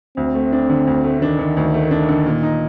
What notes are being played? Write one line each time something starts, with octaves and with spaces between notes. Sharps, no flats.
D2 C4
A3
D4
D3
D2
A3
D#3 D4
D3
D2
A3
D4
D3
A#2
D#4